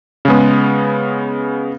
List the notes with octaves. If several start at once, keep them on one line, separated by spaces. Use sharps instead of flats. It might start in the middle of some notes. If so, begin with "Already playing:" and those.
C#3 G#3 B3